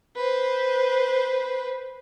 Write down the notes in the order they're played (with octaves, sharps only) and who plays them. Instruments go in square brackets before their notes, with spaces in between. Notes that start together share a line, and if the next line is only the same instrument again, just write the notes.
[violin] B4 C5